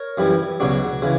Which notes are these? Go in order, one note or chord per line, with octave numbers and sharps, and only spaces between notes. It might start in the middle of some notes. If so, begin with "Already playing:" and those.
Already playing: A#4 C#5
F#2 E3 G3
C#2 B2 F#3 D4 F#4
C#3 E3